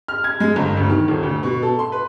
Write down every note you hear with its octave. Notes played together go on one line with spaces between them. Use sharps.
F6
G#6
G#3
G1
D2
D#3
D#1
D2
B2
A4
C6
B4